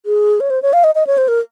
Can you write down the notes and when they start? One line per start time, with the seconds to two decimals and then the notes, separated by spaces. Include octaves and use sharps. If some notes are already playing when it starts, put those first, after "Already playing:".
0.06 G#4
0.40 C#5
0.50 C5
0.62 C#5
0.73 F5
0.84 D#5
0.95 D#5
1.07 C#5
1.18 C5
1.28 A#4